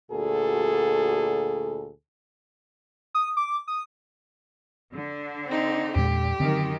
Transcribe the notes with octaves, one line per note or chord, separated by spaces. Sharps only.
D2 A#2 F#4 G#4 A4
D#6
D6
D#6
D3
C4 D#4
E2 A#2 G#3 G4
F#2 D3 D#3 C4